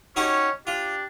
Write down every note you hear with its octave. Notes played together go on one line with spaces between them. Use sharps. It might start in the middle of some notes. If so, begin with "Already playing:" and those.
C#4 D#4 F#4 G4 C#5
D4 F4 G4